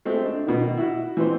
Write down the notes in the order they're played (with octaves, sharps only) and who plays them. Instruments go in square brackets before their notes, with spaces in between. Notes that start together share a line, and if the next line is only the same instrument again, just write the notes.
[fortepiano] G#3 A3 C4
D4
B2 D#3
E4 F#4
E3 C4 C5